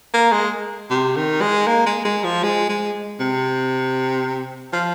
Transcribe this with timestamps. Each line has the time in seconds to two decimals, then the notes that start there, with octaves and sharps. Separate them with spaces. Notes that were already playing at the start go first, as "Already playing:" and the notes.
0.14 A#3
0.32 G#3
0.91 C3
1.16 D#3
1.41 G#3
1.67 A#3
1.86 G#3
2.05 G#3
2.24 F3
2.43 G#3
2.69 G#3
3.20 C3
4.73 F3